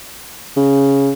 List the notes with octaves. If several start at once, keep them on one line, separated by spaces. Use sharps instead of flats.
C#3